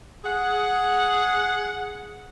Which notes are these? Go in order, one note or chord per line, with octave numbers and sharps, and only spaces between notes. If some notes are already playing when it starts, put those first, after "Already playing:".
G#4 F#5